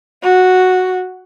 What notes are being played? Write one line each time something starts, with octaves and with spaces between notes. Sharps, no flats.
F#4